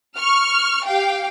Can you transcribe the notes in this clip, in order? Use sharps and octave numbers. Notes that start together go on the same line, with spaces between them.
C#6 F6
G4 F5 G5